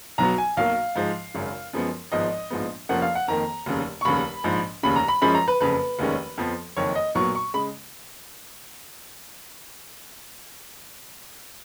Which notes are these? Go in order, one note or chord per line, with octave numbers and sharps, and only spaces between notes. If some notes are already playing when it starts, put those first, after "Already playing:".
B1 B2 F#3 B3 A#5
G#5
B1 B2 F#3 A#3 F5
G#2 F3 G#3
G#1 F#2 C#3
F#2 F3 G#3 B3
G#1 G#2 F3 G#3 B3 D#5
A#1 G#2 F3 G#3 B3
F1 F2 F3 A#3 C#4 F#5
F5
F#5
F2 D#3 A#3 A#5
F1 D#2 C#3
C#6
F1 D#2 C#3 B5
A#1 G#2 F3
F1 D#2 C#3 B5
A#5
B5
F#2 F3 G#3 C#4 B5
A#5
B4
F#1 F2 C#3 B4
F1 D#2 D#3 G#3 C#4
F2 F3 B3
F#1 F2 D#3 C#5
D#5
B1 A#2 F#3 B3 C#6
C#6
C#3 G#3 B5